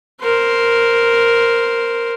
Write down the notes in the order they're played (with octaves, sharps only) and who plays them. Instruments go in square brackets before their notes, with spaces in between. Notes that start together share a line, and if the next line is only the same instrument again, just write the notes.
[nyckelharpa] A#4 C5